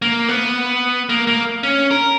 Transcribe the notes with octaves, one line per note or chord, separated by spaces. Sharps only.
A#3
B3
A#3
A#3
C#4
A#4